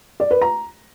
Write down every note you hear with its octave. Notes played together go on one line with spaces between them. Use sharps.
D5
B4
A#5